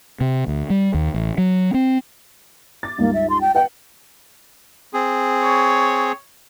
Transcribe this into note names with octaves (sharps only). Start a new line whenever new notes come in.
C3
D2
G3
D#2
A1
F#3
C4
D6 A6
C#2 G2 A#3 D#4
E5
C6
G5
B4 D#5 F#5 G5
C4 G#4
C#5